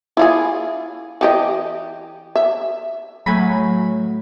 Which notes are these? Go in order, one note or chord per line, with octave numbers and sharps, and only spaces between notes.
E4 F4 G#4
E3 G4 D#5
E5
A2 F#3 G#5 B5